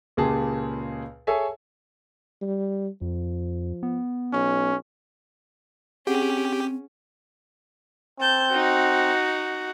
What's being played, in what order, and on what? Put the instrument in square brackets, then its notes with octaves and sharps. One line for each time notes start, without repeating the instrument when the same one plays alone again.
[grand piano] C#2 A#2 C#3 G4 G#4 A5
G#4 A4 C#5 E5 G#5
[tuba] G3
[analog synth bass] F2 [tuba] F3
[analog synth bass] B3
[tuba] B1 [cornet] C#4
[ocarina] C4 [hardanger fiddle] C#4 [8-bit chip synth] G4 [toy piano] G#4 F#5
[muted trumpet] C4 [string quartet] A5 G6
[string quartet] D#4 [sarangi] F#4